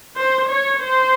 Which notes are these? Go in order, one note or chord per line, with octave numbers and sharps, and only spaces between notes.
C5
C#5
C5